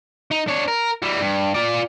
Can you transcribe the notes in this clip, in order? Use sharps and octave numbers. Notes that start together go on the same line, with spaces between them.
D#4
D4 C#5
A#4
E3 G3
G2
F4 D5